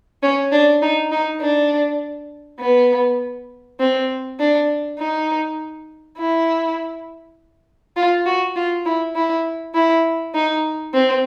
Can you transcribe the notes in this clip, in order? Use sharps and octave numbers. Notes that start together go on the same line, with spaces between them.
C#4
D4
D#4
D#4
D4
B3
C4
D4
D#4
E4
F4
F#4
F4
E4
E4
E4
D#4
C4